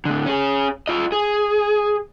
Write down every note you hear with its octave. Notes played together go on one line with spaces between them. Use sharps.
A2 D3
C#4 G#4
F4 D#5
G#4